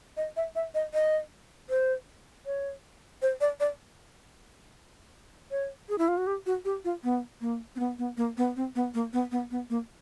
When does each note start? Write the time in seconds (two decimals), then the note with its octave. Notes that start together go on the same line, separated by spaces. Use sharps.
0.17 D#5
0.37 E5
0.55 E5
0.75 D#5
0.94 D#5
1.70 C5
2.46 C#5
3.22 C5
3.41 D5
3.60 D5
5.51 C#5
5.89 G#4
5.98 E4
6.08 F4
6.18 F#4
6.27 G4
6.46 F#4
6.65 G4
6.85 F4
7.04 B3
7.41 A#3
7.76 C4
7.79 B3
7.99 B3
8.17 A#3
8.37 B3
8.56 C4
8.75 B3
8.94 A#3
9.13 B3
9.32 B3
9.51 B3
9.70 A#3